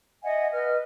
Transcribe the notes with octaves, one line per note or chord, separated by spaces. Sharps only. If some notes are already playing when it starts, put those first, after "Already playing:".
D#5 E5 F#5 G#5
B4 D#5 F6